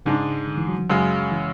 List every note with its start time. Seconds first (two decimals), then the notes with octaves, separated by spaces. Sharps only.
0.06 G#2 C#3 G#3 D4
0.47 D3
0.58 E3
0.68 F#3
0.79 F#3
0.89 F#2 C#3 F#3 G#3
1.31 E3